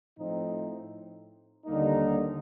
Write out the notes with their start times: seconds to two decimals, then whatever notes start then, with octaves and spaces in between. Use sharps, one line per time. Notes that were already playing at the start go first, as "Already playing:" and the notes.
0.17 A2 F3 C4 D#4
1.65 D#2 D3 G3 A#3 D#4